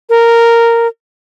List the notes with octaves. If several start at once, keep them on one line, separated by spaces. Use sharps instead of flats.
A#4